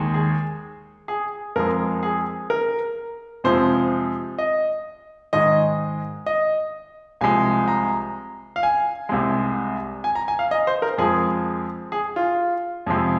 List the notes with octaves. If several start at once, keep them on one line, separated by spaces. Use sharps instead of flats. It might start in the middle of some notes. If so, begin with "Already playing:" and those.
Already playing: D#2 D#3 G#3
G#4
G#4
F2 F3 G#3 A#4
G#4
A#4
F2 C3 F3 G#3 C5
D#5
G#2 D#3 G#3 D#5
D#5
C2 C3 F3 G#3 G#5
A#5
F5
G#5
C2 C3 G#3
G#5
A#5
G#5
F5
D#5
C5
A#4
F2 F3 G#3 G#4
G#4
F4
F2 C3 F3 G#3